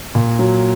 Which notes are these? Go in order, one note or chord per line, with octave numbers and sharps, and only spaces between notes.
A#2
F#3